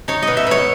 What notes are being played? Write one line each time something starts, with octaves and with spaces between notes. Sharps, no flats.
D#4 C#5
B2 D#5
E5
B2 C#5